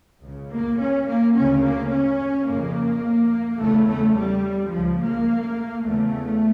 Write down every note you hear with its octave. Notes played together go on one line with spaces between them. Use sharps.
C#2 C#3
A#3
C#4
A#3
D2 C#3 C#4
A#3
C#4
F2 C#3 A#3
E2 C#3 A3
A3
G3
C#2 C#3 F3
A#3
E2 C#3 A3